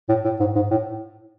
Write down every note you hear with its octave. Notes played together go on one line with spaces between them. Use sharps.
A2
A2
G#2
G#2
A2